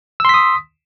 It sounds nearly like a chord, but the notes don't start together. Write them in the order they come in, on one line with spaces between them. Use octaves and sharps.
E6 C6 B6 D#6